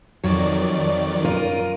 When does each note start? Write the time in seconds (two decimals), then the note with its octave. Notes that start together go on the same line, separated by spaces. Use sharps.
0.24 F2 D#3 F#3 D5
1.24 F#2 F4 A#4 D#7